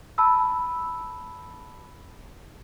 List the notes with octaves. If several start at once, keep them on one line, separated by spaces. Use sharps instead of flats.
A5 B5 E6